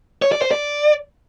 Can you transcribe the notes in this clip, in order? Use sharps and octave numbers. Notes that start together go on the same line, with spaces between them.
C#5
D5
C5
D5